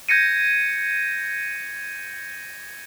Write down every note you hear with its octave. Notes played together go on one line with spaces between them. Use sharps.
G6 G#6 A#6 C#7 D#7